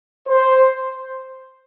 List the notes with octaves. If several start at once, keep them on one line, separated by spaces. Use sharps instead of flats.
C5